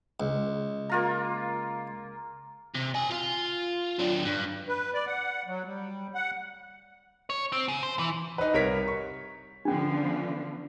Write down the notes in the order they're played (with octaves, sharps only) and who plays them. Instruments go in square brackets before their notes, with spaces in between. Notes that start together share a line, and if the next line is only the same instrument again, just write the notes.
[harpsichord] C#2
[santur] A#3 F4 A#5
[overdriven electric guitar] C3
G4 G#5
F4 F5
F#3 D4
G2
[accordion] B4
D5
F#5
F#3
G3
F#5
[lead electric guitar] C#5
C4
C#3
C5
E3
[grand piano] D#4 B4
C2 A#4 C#5 B6
C#6
[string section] D3 F3 B3 [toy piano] C#4 D4